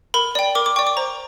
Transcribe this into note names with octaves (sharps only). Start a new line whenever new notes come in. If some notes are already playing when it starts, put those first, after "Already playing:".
A#4 B5
D5 G5
A#4 D6
D6
D5 G5 C#6
D6
C5 A#5